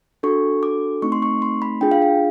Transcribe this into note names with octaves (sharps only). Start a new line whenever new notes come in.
D4 F#4 A4 C#6
D6
A3 C4 D#4 C#6
C6
C#6
C6
B5
D4 F4 G#4 G5
F5
F5